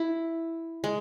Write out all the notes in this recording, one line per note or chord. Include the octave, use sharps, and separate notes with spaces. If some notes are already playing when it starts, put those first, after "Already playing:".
Already playing: E4
G#3